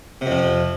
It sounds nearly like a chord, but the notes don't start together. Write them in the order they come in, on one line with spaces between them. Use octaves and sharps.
C3 F2 F3